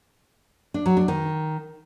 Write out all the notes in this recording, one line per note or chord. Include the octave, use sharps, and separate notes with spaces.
D4
F#3
D4
D#3